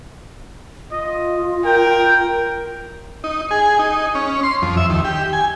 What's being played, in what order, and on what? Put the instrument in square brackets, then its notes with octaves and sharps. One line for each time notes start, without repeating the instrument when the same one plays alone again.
[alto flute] F4 [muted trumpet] D#5
[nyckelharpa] A#4 [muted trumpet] G5
[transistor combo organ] D#4
G#4
D#4
C#4
C6
F2
E5
D#2
G4
G#5